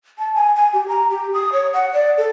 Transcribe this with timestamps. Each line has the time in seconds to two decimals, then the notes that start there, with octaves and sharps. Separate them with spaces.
0.18 A5
0.35 G#5
0.56 G#5
0.73 G4
0.88 A#5
1.10 G4
1.34 D#6
1.52 C#5
1.74 F#5
1.93 D5
2.18 A4